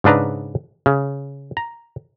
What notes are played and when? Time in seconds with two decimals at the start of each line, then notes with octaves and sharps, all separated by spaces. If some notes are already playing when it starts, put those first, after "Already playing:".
0.04 G#2 C#3 D4 B4 A#5
0.86 C#3
1.57 A#5